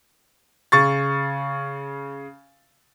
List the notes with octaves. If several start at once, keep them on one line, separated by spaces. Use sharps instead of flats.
C#3 C#6 A6